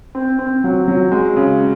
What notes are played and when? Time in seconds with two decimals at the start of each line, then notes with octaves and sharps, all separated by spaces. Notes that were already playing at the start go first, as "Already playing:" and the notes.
0.15 C4
0.39 C4
0.64 F#3
0.88 F#3
1.12 G#3
1.36 C#3